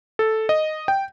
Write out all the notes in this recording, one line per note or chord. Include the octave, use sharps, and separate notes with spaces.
A4
D#5
G5